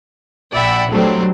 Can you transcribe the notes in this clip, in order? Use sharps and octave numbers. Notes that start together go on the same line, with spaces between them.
A#1 D5 E5 F#5 G5 B5
F#3 G3 A3 C4 D4